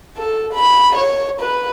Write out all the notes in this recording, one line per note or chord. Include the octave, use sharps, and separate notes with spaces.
A4
B5
C#5
B4